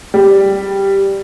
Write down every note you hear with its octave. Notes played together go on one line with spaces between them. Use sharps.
G3